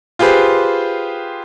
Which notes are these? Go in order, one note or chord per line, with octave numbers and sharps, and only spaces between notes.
F4 G4 G#4 B4 C5